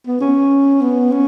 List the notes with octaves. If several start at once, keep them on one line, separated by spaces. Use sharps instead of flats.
B3
C#4
B3
C#4